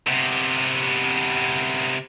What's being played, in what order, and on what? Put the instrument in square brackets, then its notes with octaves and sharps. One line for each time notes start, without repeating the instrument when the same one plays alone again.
[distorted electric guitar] C3 B3